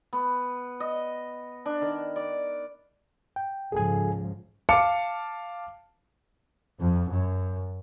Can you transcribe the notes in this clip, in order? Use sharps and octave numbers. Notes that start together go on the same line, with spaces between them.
B3
D#5
D4
D#3
D5
G5
C#2 G#2 F3 G#4 A4 G#5
F5 A5 D6 C#7
F2
F#2